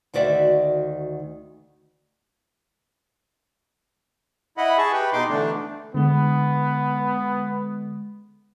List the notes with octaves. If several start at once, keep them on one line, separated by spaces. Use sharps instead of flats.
D2 D#3 F#4 D5 E5
E4 D#5 F#5 B5
G#4 A5 C#6
G4 B4
B2 D#4 C6 D6
D3 E3 A3 D4
D3 G#3 B3